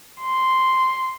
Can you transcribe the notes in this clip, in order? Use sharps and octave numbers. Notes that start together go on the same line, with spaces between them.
C6